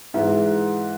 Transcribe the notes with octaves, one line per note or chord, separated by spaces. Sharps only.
G#2 E3 G#3 E5